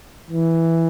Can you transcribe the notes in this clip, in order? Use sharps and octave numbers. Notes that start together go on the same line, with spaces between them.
E3